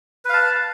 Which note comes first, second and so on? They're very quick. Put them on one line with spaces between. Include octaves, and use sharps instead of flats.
B4 F5 A5